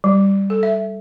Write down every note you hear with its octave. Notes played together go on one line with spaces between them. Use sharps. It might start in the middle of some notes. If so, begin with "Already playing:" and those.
G3
A4
E5